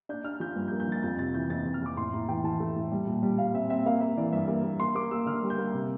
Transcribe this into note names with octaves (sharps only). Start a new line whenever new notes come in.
D4 G6
D4 F6
F3 G6
G2
G6
A#3
G6
F3 A6
F2 G6
C3 A6
E3 G6
F2 A6
F2
F6
F2 D6
A2 C6
A2 A#5
E3 G5
E3 A5
A3
A2
G3
A#2
G3
G3 F5
C4 E5
C4 E5
A#3 F5
A#3 E5
E3 D5
G2 E5
A#3
A#3
A#3 C6
A#3 D6
A#3 E6
D3 F6
G3
G6
A#3
C3